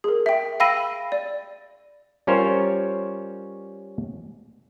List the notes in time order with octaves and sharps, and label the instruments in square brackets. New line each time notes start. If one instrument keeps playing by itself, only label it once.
[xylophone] G#4 A#4
E5 G5
F5 G5 B5 E6 A#6 D#7
D5
[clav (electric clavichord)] G3 C#4 F4 A#4 C5 C#5